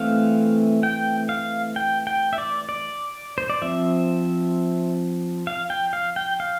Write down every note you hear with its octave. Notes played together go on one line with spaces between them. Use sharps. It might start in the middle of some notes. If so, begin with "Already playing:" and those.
Already playing: E3 A3 C4 F5
G5
F5
G5
G5
E5
D5
D5
C5
D5
F3 C4 E5
F5
G5
F5
G5
F5